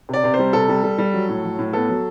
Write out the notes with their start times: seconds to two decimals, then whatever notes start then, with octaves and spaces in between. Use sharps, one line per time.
0.09 C3 D5
0.24 C3
0.34 C5
0.39 G3
0.53 C3 A4
0.69 G3
0.83 G3
0.98 G3
1.14 F#3
1.29 A2
1.44 F#3
1.59 A2
1.73 B3 A4
1.89 F#3